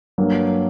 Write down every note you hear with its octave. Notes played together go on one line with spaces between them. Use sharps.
G2 F#3 A#3